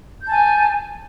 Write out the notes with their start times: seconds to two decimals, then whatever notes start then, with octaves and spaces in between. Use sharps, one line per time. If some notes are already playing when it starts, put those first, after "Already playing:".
0.22 G6
0.27 A5
0.31 G#5